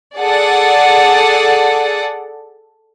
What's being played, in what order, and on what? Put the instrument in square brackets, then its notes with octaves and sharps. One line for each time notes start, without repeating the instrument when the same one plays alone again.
[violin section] G#4 A4 D5 F#5